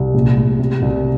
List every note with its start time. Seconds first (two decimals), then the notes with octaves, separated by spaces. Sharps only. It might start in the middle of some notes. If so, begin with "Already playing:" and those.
Already playing: C2
0.14 A#1
0.37 A2
0.59 C3
0.82 C2